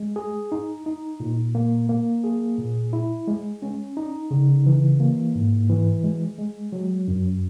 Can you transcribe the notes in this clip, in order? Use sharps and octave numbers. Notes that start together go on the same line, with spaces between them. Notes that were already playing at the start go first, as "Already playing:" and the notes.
Already playing: G#3
G#4
D#4
D#4
A#2
A#3
A#3
G#4
A#2
E4
G#3
C#4
D#4
C#3
E3
A#3
G#2
E3
G#3
G#3
F#3
F#2